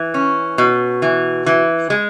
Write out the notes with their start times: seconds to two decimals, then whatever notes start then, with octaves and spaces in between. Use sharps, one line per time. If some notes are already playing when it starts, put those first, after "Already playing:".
Already playing: E3
0.14 C#4
0.58 B2
1.02 E3
1.46 E3
1.90 G#3